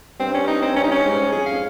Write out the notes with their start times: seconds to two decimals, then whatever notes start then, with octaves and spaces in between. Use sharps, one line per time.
0.20 G2 C4
0.34 C#4
0.47 D#4
0.62 C4
0.76 G2 C#4
0.84 D#4
0.92 C#4
1.04 G#2
1.32 F2 G#4
1.46 F5